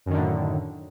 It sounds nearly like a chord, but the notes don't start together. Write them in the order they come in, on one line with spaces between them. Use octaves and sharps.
F#2 D#3 D3 A2